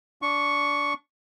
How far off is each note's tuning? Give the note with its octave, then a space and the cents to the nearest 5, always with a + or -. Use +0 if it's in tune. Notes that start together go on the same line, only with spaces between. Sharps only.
D4 -20 C#6 +0